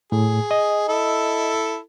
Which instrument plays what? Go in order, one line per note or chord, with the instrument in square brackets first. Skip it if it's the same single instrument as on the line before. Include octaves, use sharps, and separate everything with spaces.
[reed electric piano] A2 [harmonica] G#4
[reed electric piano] D#5
[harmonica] E4 A4